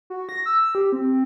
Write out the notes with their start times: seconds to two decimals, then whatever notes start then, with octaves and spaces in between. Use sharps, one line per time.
0.10 F#4
0.29 A#6
0.46 E6
0.75 G4
0.92 C4